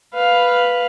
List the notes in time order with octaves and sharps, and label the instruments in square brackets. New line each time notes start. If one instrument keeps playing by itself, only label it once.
[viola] B4 F5